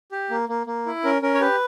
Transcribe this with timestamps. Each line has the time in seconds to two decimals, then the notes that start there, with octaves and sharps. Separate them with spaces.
0.12 G4
0.31 A#3
0.49 A#3
0.67 A#3
0.86 E4
1.04 C#4 A#4
1.22 C#4 A#4
1.34 C#5
1.40 G4 B4